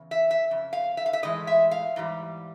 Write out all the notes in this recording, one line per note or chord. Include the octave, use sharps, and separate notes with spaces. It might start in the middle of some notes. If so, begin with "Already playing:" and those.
Already playing: E2 C#3
E5
E5
F2 C#3
F5
E5
F5
E5
A2 E3 G#3 D#5
E5
F5
G#2 E3 G3